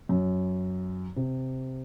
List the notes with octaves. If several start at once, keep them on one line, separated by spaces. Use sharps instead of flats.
F#2
C3